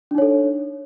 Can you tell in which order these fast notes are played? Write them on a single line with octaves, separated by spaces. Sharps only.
D4 D#4 C#5 A4